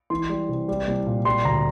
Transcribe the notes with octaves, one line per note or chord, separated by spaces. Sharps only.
E3 C6
G3
C3
G3
C2
A#2
G3 C6
D2 A#5